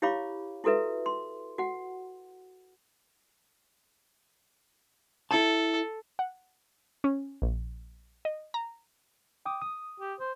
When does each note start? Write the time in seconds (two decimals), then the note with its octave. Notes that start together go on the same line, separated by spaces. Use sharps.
0.02 E4 G4 C#5 F5 B5 D6
0.64 E4 F#4 A4 B4 E5
1.06 C6
1.58 F#4 F#5
5.31 E4 A4 A5
6.19 F#5
7.04 C#4
7.42 A#1
8.25 D#5
8.54 A#5
9.46 G5 D6 D#6
9.62 D#6
10.00 G4
10.20 C5